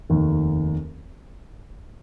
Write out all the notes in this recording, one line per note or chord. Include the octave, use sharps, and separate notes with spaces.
F1 D#2 D#3